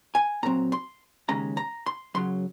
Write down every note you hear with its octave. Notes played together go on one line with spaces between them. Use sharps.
G#5
A#2 F#3 C4 A#5
C6
D#2 C#3 G#3 C#4 A#5
A#5
C6
F#2 C#3 F#3 C6